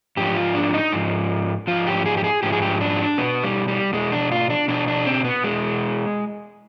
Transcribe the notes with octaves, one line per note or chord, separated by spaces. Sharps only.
G#2 F3 G4
F4
D4
D#4
G#2 F3
G#2 F3 F4
G4
G#4
G4
G#4
G#2 F3 G4
G#4
G4
D4
B2 B3
G3
G3
B2 G#3
D4
F4
D4
B2 D4
D4
C4
B3
B2 G#3